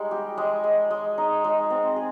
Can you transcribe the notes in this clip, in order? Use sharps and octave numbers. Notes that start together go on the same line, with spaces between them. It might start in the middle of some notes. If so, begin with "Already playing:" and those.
Already playing: G3 G#3 D#4
G4
G#3
G#3
G#3
D#4
G#3
C4
G#4